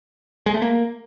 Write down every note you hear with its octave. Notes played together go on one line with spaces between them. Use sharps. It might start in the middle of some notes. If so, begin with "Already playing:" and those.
G#3
A3
A#3